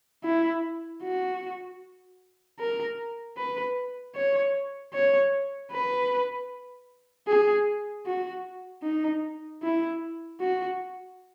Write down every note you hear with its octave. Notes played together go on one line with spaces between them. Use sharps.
E4
F#4
A#4
B4
C#5
C#5
B4
G#4
F#4
D#4
E4
F#4